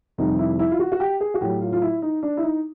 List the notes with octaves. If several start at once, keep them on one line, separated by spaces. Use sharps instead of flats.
F2 C3 D#3 G3 D#4
E4
E4
F4
F#4
F#4
G4
G#4
F#4
A2 F#3 G4
F4
F4
E4
D#4
D4
E4
D#4